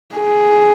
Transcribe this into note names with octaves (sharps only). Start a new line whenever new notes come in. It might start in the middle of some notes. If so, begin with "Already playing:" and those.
G#4